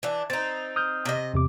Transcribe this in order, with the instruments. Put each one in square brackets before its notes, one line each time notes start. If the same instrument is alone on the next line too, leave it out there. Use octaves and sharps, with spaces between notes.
[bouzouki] E3 D4
[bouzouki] C4 D#4 [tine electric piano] A6
[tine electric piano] D#6 F6 G6
[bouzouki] C3 D#5
[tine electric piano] E2 C3 D6